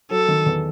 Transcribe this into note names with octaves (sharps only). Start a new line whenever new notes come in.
F#3 A4
D#3
E2